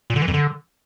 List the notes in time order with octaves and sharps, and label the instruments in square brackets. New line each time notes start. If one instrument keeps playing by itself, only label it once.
[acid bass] A#2
D3
E3
F2
D3